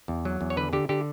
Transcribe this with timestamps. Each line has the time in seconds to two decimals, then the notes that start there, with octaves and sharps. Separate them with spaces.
0.08 E2
0.25 F#3
0.41 E2
0.50 C#5
0.57 D3 B4
0.73 D3 G4
0.89 D3 G4